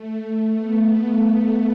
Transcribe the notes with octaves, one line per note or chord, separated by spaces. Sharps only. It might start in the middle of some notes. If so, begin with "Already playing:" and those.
Already playing: A3
A3
B3